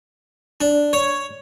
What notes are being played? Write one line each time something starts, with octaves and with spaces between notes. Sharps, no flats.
D4
C#5